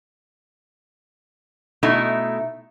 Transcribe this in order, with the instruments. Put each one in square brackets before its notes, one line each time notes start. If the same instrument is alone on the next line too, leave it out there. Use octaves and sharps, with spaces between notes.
[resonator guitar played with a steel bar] B2 A3 D#4 E4